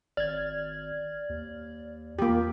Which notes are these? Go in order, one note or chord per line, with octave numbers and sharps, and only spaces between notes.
G#1 D5 F6 G#6
D#2
E2 A#3 F4 G4